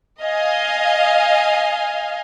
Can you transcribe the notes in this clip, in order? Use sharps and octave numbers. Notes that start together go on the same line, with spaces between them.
D#5 F5 G#5